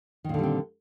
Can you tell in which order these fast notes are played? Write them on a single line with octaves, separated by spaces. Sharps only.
D#3 A#2 D3 G3 C4